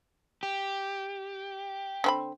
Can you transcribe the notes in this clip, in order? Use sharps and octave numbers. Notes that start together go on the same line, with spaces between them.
G4
D3 C4 B5